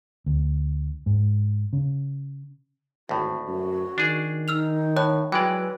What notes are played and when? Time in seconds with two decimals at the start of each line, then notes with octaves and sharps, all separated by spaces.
0.26 D2
1.06 G#2
1.73 C#3
3.09 G#1 D2 A2 F#4
3.47 F#2 F#4
3.98 D#3 D4 G#4
4.48 D#4 E6 F6 F7
4.97 A2 C#5 F#6
5.32 E3 F#3 G#3 B4 D5 G5